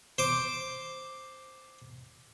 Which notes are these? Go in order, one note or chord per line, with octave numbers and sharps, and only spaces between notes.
C5 D6